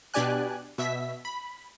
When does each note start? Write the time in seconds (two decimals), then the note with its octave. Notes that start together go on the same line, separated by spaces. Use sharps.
0.14 B2 D4 G4 D5 G#5 F#6
0.78 B2 E5 B6
1.25 B5